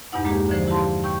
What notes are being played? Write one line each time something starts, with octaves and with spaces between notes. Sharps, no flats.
E2 G2 B2 D#4 E4 F#5
G#3 A#3 D4 G4 G#4
D3 E3 F3 C5
E4 G4 F5 A5 C6
G5 C#6 E6 G6